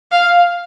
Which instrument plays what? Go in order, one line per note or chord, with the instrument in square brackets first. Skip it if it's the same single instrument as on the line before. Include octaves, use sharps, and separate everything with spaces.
[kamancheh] F5